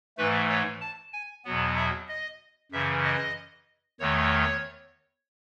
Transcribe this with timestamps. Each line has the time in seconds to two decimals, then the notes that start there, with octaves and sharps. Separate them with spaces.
0.18 G#2 E3 A3 B4
0.49 C#5
0.81 A5
1.13 G#5
1.45 E2 B2 F#3 B3
1.77 E5
2.08 D#5
2.72 F#2 C#3 E3 E5
3.04 D#5
4.00 E2 D#3 A3 C#5